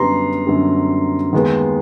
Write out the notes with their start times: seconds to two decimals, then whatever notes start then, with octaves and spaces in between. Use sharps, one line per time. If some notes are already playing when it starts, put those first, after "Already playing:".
Already playing: F#2 D3 G3 B3 A#5 C6
0.46 F#2 D3 G3 B3
1.33 D#2 D#3 G#3 B3